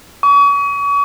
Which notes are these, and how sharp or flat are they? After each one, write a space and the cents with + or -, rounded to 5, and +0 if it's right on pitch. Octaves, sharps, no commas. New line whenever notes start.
C#6 +40